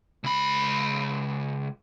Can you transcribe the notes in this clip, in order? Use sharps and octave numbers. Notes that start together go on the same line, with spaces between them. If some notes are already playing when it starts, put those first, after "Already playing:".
C#2 B5